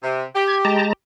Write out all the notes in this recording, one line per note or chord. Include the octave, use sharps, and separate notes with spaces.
C3
G4
G#6
G#3 A5 A#5